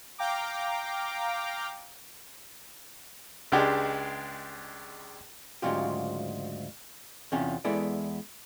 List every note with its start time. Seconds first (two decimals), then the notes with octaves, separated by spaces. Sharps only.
0.18 F5 G5 A#5 D6
3.52 C#2 G#3 D4 G4
5.62 D2 G#2 C#3 F#3 F4 G4
7.32 E2 C3 C#4 F4
7.65 E2 G#3 B3 E4 A4 D5